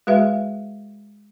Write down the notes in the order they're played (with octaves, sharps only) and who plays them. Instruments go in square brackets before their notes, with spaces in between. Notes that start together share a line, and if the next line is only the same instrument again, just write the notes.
[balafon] G#3 F#4 G#4 B4 E5 F5